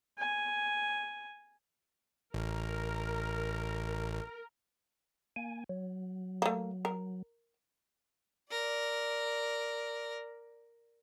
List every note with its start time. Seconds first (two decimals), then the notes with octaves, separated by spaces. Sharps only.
0.18 G#5
2.34 A1 A#4
5.36 A#3 G#5
5.69 F#3
6.42 A3 A#3
6.85 A#4
8.51 A#4 D5